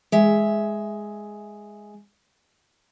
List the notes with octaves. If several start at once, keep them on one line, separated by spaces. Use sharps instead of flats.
G#3 E5